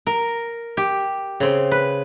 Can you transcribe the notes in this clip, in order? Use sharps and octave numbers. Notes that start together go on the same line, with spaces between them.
A#4
G4
C#3 C4
B4